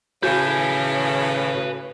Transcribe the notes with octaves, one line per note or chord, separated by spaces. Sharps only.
A2 C#3 F#4 B4 G#5 G6